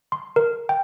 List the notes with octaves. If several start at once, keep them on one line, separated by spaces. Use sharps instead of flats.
C6
A#4
G5